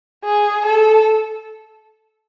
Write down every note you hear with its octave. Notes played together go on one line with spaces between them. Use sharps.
G#4
A4